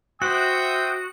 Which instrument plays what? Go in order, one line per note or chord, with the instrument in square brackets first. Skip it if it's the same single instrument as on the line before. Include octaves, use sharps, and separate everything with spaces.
[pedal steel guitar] F#4 [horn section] C5 E5 G5 [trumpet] D#6 [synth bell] F#6